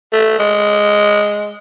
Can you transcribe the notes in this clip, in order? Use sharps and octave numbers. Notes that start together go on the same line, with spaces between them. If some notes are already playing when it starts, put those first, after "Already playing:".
A3
G#3